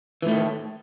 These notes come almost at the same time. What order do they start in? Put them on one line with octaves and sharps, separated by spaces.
E3 A2 A3 D#3